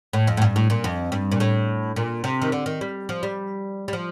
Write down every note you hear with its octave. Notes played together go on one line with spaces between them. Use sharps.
A2
F2
A2
G2
A2
A#2
F2
G2
A#2
A2
A#2
C3
D#3
D3
D#3
G3
F3
G3
G3
F3